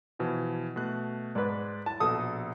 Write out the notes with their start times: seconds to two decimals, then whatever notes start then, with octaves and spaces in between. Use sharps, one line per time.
0.19 B2 E3 F3
0.76 B2 A3 F#6
1.35 G#2 B4 D5
1.86 E4 A5
2.00 A#1 B2 A4 D#6